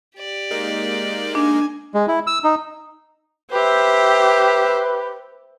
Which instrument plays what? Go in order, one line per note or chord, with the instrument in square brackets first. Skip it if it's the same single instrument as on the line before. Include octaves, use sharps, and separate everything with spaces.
[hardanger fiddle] G4 D5
[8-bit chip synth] G#3 A#3 D#4
[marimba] D4 [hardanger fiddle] G#5
[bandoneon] G#3
E4
E6
D#4
[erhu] G4 [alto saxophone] B4 [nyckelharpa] C5 E5